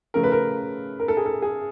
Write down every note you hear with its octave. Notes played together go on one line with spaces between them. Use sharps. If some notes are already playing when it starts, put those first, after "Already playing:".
C#3 F3 A3 A#4
B4
A#4
A#4
A4
G#4
A4
G#4